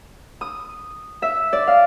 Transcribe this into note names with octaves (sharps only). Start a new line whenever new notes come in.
D#6
E5
D5
F5